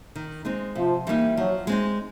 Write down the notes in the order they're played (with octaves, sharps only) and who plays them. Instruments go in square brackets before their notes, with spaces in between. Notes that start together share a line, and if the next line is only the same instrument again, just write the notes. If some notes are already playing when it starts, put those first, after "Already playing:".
[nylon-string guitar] D#3
G#3 C4 D#4
[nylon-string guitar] C3 [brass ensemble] F3
[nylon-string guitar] E3 G3 A#3 D#4
[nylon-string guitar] F3 [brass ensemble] F#3
[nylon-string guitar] G#3 C4 D#4